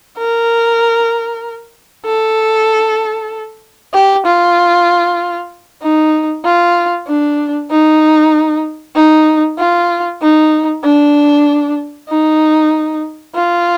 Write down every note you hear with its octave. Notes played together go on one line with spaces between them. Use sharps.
A#4
A4
G4
F4
D#4
F4
D4
D#4
D#4
F4
D#4
D4
D#4
F4